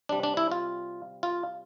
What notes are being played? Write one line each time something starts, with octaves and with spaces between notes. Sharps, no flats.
C3 G3 D4
D4
E4
F4
F4